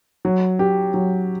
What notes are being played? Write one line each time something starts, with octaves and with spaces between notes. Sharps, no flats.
F#3
G4
F#3